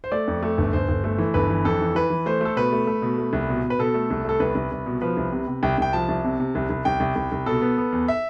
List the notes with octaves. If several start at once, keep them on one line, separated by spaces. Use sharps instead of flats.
C5
A3 D5
F2
A3
G1
G1 C5
G1
A3
E3
G1 B4
E3
F2 A4
E3
E3 B4
E3
A3 C5
A3 A4
B2 B4
A3
A3
B2
A3
C2
B2
B2
B4
B2 A4
A3
C2
A3 A4
C2 B4
C2
C2
B2
F3 B4
C2
C3
C3
C2 G5
C2 G5
F3 A5
C2
C3
C3
C2
C2
C2 G5
C2
C2
C2
B2 A4
B3
B3
E2
E5